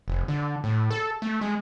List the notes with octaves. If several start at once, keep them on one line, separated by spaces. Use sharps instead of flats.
F1
D3
A2
A4
A3
G#3